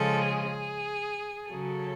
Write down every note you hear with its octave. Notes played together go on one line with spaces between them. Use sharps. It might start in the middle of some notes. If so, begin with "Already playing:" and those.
Already playing: C#3 F3 G#3 A4
G#4
C#3 F#3 A4